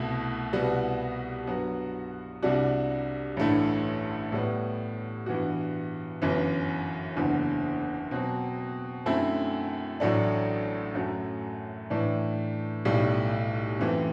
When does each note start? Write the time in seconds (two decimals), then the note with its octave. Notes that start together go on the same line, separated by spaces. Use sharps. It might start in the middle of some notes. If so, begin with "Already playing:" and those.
Already playing: C2 B2 A3 E4
0.53 C2 B2 G3 B3 F#4
1.47 G2 F#3 B3 F#4
2.43 C2 C3 G3 D4 F#4
3.37 A1 G2 D3 A3 E4
4.32 A2 G3 B3
5.26 G2 E3 B3 F#4
6.22 G1 F#2 E3
7.17 F#1 E2 D3
8.11 B2 F#3 C4 F#4
9.06 F#2 D3 A3 C4 E4
10.00 A1 A2 F#3 A3 D4
10.95 F#2 F#3 A3
11.90 A2 E3 A3 D4
12.85 B1 A2 G3
13.79 F#2 E3 A3 C4